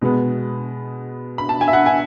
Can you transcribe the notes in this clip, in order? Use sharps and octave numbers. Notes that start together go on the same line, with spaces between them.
B2 G#3 B3
B5
A5
G#5
E5
F#5
G#5